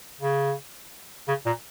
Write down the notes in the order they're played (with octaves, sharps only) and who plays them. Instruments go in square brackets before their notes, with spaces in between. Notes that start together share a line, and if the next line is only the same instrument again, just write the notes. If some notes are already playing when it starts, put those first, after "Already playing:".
[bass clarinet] C#3
C#3
A#2